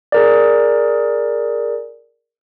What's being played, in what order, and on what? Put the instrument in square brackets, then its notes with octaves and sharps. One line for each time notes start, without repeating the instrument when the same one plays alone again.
[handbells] G#4 A#4 D5